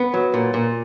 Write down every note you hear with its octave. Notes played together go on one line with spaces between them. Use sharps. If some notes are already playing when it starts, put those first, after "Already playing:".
Already playing: B3
F#3
A#2
A#2